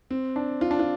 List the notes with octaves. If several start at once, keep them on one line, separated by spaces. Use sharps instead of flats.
C4
D4
F4
D4
F4